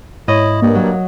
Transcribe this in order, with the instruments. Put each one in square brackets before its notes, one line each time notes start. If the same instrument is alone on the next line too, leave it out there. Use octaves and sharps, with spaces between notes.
[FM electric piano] G#2 C#5 [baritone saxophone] E4 [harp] D#5
[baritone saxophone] G2 [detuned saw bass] A#3
[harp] F#3